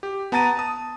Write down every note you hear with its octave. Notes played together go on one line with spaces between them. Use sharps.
G4
B3 A5 A#5 A6 D#7
A5 D#6